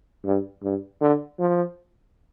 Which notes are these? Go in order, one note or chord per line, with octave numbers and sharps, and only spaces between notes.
G2
G2
D3
F3